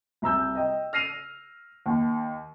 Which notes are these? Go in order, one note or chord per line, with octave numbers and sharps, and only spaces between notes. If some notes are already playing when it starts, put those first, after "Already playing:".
C2 A#5 E6 G6
D#5 G5
F6 A#6 C7 D#7 F7
D#2